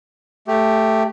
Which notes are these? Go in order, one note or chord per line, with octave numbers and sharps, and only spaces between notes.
A3 G4